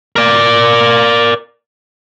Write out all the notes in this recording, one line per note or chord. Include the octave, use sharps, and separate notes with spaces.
A#4 D5